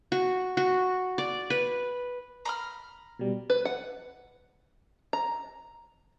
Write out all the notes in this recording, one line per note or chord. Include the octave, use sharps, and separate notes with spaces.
F#4
F#4
D5
B4
A#5 B5 F6
B2 G3
B4
F#5
A#5